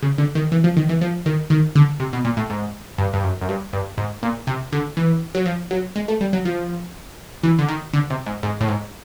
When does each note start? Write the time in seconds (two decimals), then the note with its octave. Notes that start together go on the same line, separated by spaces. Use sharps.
0.03 C#3
0.18 D3
0.35 D#3
0.52 E3
0.64 F3
0.77 D#3
0.89 E3
1.01 F3
1.26 D#3
1.50 D#3
1.75 D3
2.00 C3
2.13 B2
2.25 A#2
2.37 A2
2.50 G#2
2.98 G2
3.13 G2
3.23 F#2
3.41 F#2
3.49 G2
3.73 G2
3.98 G#2
4.23 A#2
4.47 C3
4.72 D3
4.97 E3
5.35 F#3
5.46 F3
5.71 F#3
5.96 G#3
6.08 A3
6.21 G3
6.33 F#3
6.45 F3
7.43 E3
7.59 D3
7.68 D#3
7.93 D3
8.10 C3
8.26 G#2
8.43 G#2
8.61 A2
8.68 G#2